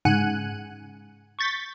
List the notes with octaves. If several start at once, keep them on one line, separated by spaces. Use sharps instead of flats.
G#2 C#3 F#5 G#5 F#6 D#7
C#6 G6 A6 B6